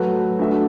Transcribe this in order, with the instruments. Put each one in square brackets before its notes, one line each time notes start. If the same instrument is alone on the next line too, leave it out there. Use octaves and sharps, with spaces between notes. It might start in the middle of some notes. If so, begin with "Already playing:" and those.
Already playing: [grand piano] F#3 A3 F#4 B4
A3 D4 F#4 B4 E5